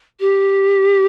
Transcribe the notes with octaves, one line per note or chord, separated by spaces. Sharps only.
G4